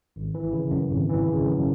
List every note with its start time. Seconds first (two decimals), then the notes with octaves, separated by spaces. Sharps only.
0.16 G#1
0.35 E3
0.53 C#3
0.71 F#2
0.91 G#1
1.09 E3
1.28 C#3
1.45 F#2